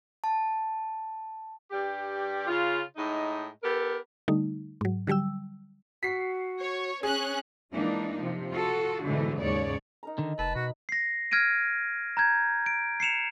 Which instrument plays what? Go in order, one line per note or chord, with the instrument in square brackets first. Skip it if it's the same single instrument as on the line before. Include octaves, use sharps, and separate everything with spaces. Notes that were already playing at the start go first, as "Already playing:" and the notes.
[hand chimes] A5
[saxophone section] G2 G3 G4
C#3 F4
A2 G#3 D#4
B3 G4 A4 A#4
[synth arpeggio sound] D3 G3 A3 D#4
G#2 F#3
D3 F#3 G3 G5 E6
[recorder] F#4 [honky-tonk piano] B6 C7
[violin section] C#5
[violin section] C#4 F#6 [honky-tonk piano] G#4
[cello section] E3 G#3 A#3 D4 D#4
C3 F3
F4 F#4 A4
G#2 B2 D3 E3 A3
D#2 G#2 C#3 C#5 D5
[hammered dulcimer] D#4 A#4 A#5
[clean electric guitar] D3 D#3
[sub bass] F1 [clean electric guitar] B4 [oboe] A5
[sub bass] B2 [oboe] F#4
[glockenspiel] A#6 C7
F6 G#6 A#6 D7 D#7
A#5 G6 G#6
D7
C7 C#7 E7 F7